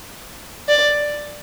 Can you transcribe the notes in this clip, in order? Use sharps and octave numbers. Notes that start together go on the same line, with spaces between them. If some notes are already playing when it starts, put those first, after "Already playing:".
D5